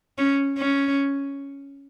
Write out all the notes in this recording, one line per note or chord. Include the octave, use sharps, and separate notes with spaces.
C#4
C#4